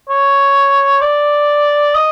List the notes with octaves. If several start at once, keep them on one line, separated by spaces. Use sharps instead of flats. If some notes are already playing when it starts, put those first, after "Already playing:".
C#5
D5
D#5